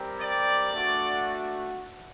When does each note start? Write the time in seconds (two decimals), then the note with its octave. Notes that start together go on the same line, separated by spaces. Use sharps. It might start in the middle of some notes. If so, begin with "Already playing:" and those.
Already playing: G3 C4 G4 A#4
0.20 D5
0.72 A3 D4 F#4